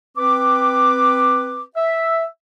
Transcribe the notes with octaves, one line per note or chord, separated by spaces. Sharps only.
C4 B4 D6
E5